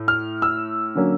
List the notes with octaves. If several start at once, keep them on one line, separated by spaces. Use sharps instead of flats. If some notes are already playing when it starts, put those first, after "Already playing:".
Already playing: A2
F6
E6
D3 F#3 A#3 C#4